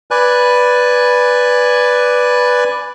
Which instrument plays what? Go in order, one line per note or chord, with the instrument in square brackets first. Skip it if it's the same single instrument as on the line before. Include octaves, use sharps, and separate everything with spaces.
[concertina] B4 D5 G#5 F#6